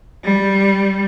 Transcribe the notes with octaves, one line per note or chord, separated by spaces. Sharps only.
G3